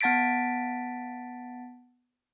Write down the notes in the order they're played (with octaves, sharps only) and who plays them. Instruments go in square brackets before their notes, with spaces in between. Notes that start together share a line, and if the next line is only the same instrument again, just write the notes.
[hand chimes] B3 F#5 A5 A6 B6 D7